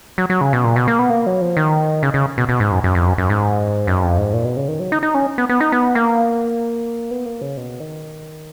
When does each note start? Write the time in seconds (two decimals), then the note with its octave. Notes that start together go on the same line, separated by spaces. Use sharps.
0.18 F#3
0.30 F#3
0.41 C#3
0.53 B2
0.64 A#2
0.76 B2
0.88 A#3
0.99 B3
1.10 A#3
1.26 F#3
1.41 F3
1.57 D#3
2.03 C#3
2.14 C#3
2.38 B2
2.49 B2
2.60 G#2
2.72 F#2
2.84 F#2
2.95 F2
3.07 F#2
3.18 F#2
3.30 G#2
3.87 F#2
4.03 F2
4.18 G#2
4.33 A#2
4.45 B2
4.57 C#3
4.68 D#3
4.80 F#3
4.92 D#4
5.03 D#4
5.14 C#4
5.38 B3
5.49 B3
5.61 D#4
5.72 B3
5.95 A#3
7.11 B3
7.26 A#3
7.41 C#3
7.57 B2
7.80 D#3